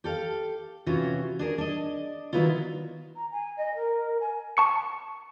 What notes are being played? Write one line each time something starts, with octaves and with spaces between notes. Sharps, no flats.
G4 A4 F5
C3 E3 C#4 F4 F#4
D4 G#4 A#4
D4 D#5
D#3 E3 F#3 B3 E4 F4
A#5
G#5
D#5
A#4
G#5
A5 C#6 C#7